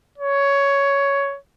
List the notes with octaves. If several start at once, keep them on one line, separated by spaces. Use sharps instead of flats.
C#5